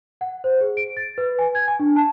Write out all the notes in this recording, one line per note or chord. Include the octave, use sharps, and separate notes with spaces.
F#5
C5
G#4
D7
A6
B4
G#5
G#6
G#5
D4
A5